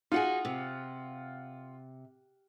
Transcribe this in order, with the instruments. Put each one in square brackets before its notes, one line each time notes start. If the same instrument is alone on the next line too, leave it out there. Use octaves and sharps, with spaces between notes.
[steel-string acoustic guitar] D#4 F#4 G#4 [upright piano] F4 F#5
[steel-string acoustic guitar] C3